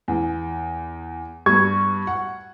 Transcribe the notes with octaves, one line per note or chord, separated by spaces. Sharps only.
E2
G2 G3 B3 C#6 G#6
F#5